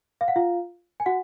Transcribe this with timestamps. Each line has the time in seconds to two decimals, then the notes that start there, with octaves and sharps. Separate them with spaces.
0.21 F5
0.28 F#5
0.36 F4 F5
1.00 G#5
1.06 F#4 F#5